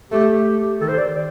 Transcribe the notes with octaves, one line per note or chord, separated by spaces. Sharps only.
A3 G4
D#3 A4
C5
D5
D5